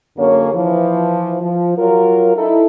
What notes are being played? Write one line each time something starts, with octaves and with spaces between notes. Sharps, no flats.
F#2 D3 A#3 G#4 C#5
E3 F3
F3
F#3 F4 A#4
D#4 E4 A4